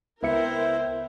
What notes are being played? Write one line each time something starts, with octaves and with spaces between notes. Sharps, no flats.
C#2 B3 E4 A#4 C5 E5 G5 C#7